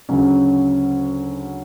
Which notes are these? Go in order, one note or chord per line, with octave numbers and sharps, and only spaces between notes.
D2 C#3 F#3 C#4